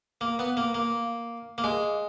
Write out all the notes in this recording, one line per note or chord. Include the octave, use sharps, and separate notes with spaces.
A#3
B3
A#3
A#3
A#3
G#3